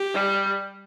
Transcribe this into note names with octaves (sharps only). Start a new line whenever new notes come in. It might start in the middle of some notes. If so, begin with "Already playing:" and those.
Already playing: G4
G3